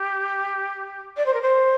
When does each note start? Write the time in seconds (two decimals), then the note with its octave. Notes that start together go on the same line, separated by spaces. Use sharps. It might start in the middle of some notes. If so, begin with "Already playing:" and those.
Already playing: G4
1.17 D5
1.26 C5
1.34 A#4
1.42 C5